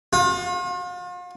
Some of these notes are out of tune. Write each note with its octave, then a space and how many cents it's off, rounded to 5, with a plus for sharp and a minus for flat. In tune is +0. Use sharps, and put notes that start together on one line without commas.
F4 +40